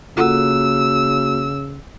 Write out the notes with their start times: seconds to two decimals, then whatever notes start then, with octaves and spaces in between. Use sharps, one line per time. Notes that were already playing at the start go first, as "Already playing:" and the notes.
0.17 C#3 A#3 F4 F#4 A4 F#5 E6